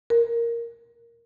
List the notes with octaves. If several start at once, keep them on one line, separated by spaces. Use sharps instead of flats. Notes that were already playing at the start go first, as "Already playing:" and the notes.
A#4